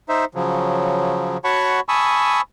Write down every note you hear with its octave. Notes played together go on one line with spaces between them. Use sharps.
D#4 C5 E5
C#3 F3 F#3
F#4 C#5 F#5 A5 B5 C#6
G#5 A5 B5 C#6 D#6 E6